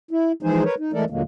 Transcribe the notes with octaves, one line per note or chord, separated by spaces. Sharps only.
E4
E3 F3 G#3 D#4 G#4 C5
A#4 B4 C#5
D#4
E3 G#3 A3 A4 A#4 D5
D#2 A#2 D3 F#3 G#3 A#3